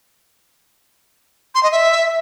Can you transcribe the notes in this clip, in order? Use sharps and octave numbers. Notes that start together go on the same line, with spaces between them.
C6
D#5
E5